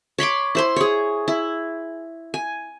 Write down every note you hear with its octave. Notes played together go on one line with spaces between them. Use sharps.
C#5 B5 C6 D6
E4 C5 C6
G#4 C#5
E4
G#5